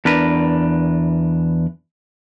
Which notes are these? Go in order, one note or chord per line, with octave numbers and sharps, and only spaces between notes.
E2 D4 A#4 B4